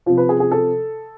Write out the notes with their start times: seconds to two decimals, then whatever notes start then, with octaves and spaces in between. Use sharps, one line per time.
0.06 C3 F3 F4
0.18 B4
0.29 G#4
0.40 G#4
0.51 A4